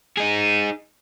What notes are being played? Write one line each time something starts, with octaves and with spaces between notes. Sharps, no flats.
D#4 G#4